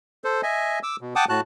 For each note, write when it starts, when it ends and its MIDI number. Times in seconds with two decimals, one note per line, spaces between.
0.24 0.41 69
0.24 0.41 72
0.43 0.79 75
0.43 0.79 76
0.43 0.79 80
0.83 0.96 86
0.83 0.96 88
1.01 1.14 47
1.16 1.25 78
1.16 1.25 79
1.16 1.25 81
1.16 1.25 86
1.16 1.25 87
1.29 1.41 45
1.29 1.41 66
1.29 1.41 81
1.29 1.41 90